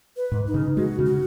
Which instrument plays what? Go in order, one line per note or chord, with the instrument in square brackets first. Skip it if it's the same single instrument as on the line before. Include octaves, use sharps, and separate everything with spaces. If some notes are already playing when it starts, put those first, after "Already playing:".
[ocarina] B4
[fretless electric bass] G#2
[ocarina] D#4
[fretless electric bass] C#3
[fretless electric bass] G#3 [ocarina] F#4
[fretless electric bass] C#3
[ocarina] F#4